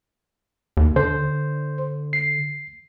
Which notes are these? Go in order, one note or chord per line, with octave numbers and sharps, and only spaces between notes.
D#2
D3 C5
C7